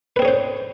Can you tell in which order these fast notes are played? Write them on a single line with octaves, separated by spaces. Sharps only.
B4 C4 G#4 C#4 C5